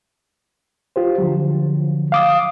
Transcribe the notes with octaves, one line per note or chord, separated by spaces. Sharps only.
F4 G4 C5
D3 F3 F#3
F5 D6 D#6